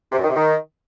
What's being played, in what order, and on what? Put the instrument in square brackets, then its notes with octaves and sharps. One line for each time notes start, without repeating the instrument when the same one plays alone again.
[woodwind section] C3
F#2
D#3
C3
D#3